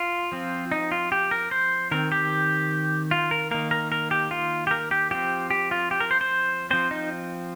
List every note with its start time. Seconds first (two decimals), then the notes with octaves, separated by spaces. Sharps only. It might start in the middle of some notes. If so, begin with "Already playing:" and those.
Already playing: F4
0.32 F3 C4
0.72 D#4
0.92 F4
1.12 G4
1.31 A#4
1.51 C5
1.91 D#3 C4 A#4
2.12 G4
3.11 F4
3.31 A#4
3.51 D#3 A#3 A#4
3.71 A#4
3.92 A#4
4.11 G4
4.31 F4
4.67 G4
4.71 A#4
4.91 G4
5.11 F3 C4 G4
5.50 G4
5.71 F4
5.91 G4
6.00 A#4
6.11 C5
6.21 C5
6.71 F3 C4 C5
6.91 D#4